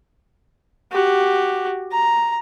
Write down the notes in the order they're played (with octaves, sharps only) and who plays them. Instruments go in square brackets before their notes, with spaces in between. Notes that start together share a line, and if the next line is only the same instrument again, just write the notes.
[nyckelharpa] F#4 G4
A#5